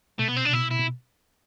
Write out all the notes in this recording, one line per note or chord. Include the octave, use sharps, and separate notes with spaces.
B2 A3
B3
C4
D4
C3
B2 E4
E4
B2